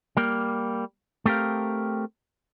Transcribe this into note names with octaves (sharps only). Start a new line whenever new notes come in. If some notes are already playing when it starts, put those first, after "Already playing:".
G3 A#3
A3 C4 G4 A#4 F5